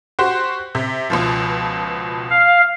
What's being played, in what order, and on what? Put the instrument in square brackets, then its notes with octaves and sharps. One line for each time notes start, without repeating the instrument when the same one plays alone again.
[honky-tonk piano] F#4 G4 C5
C3
C#2 B2 F3
[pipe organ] F5